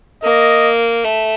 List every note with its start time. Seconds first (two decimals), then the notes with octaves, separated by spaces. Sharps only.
0.24 A#3 D#5
1.04 A3